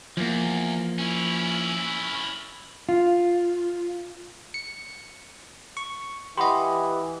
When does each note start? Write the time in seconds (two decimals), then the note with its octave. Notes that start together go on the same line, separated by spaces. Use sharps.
0.17 E2 F3 A#3
0.98 C#4 E4
2.89 F4
4.54 C#7
5.77 C#6
6.37 E3 G4 D#5 F#5 B5 C6